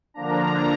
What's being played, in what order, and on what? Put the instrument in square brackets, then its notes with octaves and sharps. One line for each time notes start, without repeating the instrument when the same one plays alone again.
[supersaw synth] D3 F3 A#3 D4 A#5